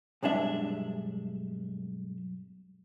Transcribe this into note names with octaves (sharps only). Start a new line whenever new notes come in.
B1 G2 G#3 D4 E5